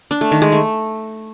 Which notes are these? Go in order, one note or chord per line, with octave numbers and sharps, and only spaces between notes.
D4
A3
D#3
G#3
A3